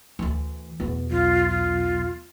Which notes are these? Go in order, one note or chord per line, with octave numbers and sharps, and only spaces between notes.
D2 E3
E2 B2 B3
B1 F4
F4